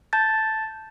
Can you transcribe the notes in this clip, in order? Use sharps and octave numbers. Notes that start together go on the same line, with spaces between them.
A5 G6 A6